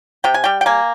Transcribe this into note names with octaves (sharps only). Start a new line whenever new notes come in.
C3 G5
G#5
G3 G5
G5
A#3 G#5